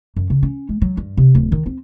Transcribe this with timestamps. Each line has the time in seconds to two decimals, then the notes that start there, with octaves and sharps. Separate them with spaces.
0.16 F#2
0.30 C#3
0.43 C#4
0.69 G#3
0.82 F#3
0.97 G2
1.17 C3
1.35 D1
1.52 D#3
1.66 C4